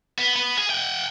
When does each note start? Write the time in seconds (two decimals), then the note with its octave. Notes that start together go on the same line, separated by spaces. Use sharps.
0.18 B3
0.36 B3
0.57 G#4
0.70 F#5 G5